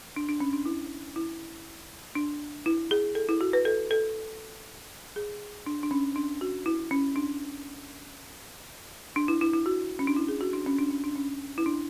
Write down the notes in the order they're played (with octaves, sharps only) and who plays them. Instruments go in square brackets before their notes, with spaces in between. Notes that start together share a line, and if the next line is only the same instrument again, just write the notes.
[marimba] D4
D4
C#4
D4
E4
E4
D4
E4
G#4
A4
E4
F#4
B4
A4
A4
G#4
D4
D4
C#4
D4
F#4
E4
C#4
D4
D4
E4
E4
E4
F#4
C#4
D4
E4
G#4
F#4
D4
C#4
D4
C#4
D4
C#4
E4
D4